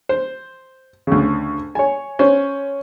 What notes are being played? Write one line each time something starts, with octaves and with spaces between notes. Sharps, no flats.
C5
D2 C#3
C#5 G#5
C#4 C5